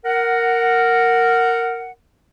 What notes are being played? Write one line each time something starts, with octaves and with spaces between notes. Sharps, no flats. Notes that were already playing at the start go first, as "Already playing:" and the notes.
A#4 F#5